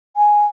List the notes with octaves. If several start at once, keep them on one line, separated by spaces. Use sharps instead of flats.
G#5